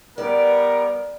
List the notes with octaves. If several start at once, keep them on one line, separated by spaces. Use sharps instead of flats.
G3 B3 A#4 D5